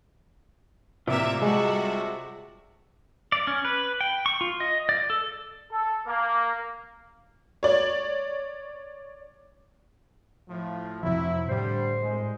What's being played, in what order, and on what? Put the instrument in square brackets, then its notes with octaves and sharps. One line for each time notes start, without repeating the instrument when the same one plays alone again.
[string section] A2 A#3 E5 [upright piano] C3 [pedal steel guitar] F4 D5 A#5
[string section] G3 F#4 A4 [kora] G#3
[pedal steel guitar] D5
C#4
B4
G5
C#6
F4
D#5
D5
A4
[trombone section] A4
A#3
[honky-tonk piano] C#5 D5
[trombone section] A2 F3
[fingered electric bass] F2 C3 F3 [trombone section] F#3 C4 E4
[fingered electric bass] A2 [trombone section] D3 G3 [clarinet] C5
[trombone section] C2 G#3